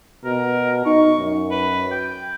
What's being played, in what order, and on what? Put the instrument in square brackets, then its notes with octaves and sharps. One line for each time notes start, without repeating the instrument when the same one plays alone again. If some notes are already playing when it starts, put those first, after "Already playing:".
[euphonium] B2 [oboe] A#4
[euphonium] D#4 [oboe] C#6
[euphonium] F#2
[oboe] B4
G5